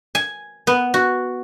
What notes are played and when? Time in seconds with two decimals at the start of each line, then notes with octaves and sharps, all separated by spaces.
0.15 G#5
0.67 B3
0.94 F#4